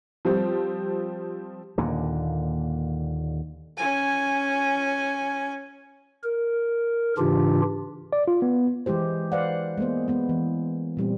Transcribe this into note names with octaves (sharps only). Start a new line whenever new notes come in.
F3 G3 C4 G4
D#2 A#2 D3
C#4 G#5
A#4
G#2 C#3 E3 D4 F4 G4
D5
F4
B3
E3 G#3 E4 G4 C5
B4 C5 D5 F5 F#5
G#3 A#3 B3 C5
G#3 B3
E3
A#2 G3 C4